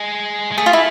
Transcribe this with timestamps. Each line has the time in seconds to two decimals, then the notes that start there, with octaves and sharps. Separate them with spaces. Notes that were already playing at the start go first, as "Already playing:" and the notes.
Already playing: G#3
0.52 G#3
0.58 A3 G#4
0.66 F4
0.73 E4